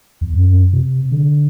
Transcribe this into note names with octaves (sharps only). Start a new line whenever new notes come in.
E2
F#2
C3
D3